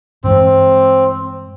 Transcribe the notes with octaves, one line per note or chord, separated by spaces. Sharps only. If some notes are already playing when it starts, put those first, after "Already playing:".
G2 E3 G#3 C4